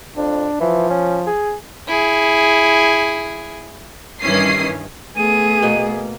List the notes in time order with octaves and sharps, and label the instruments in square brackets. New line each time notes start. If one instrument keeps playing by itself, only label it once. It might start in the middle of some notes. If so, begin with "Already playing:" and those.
[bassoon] F2 [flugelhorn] D4
[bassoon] E3 [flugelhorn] F3
[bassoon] C#4
G#4
[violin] E4 G#4
[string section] G2 D#3 E3 C#4 D#6 C7
[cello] A3 B3 [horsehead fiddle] G#4 [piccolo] D#7
[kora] B2 A#3